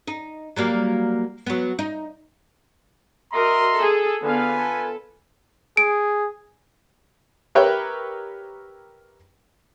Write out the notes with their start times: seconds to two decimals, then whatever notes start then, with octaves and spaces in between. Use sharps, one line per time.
0.08 D#4
0.56 F#3 G3 A#3
1.46 F#3 B3
1.79 D#4
3.32 F#4 A#4 D#5 E5 A#5 C6
3.75 G#4 A4
4.23 D3 B3 F4 B4 F5 G#5
4.59 A4
5.77 G#4 D7
7.55 G4 A#4 B4 C#5 E5 G5